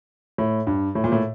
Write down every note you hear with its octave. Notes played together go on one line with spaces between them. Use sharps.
A2
G2
A2
A#2
A2